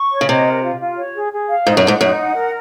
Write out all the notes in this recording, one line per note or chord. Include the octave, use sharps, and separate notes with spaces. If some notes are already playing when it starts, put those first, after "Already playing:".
Already playing: C#6
C#5
C#3
C3 D#5
A#4
F4
F4
C#5
G#4
G#4
F5
G#2 D#4
F#2
G#2 F#5
F#2 D#4
F#5
A#4